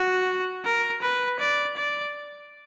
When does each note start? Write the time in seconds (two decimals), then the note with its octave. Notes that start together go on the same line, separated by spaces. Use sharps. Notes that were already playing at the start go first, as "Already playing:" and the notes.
Already playing: F#4
0.64 A#4
1.02 B4
1.40 D5
1.77 D5